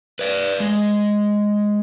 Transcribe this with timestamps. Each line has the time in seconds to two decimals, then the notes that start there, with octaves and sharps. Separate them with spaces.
0.19 B4 D5
0.60 G#3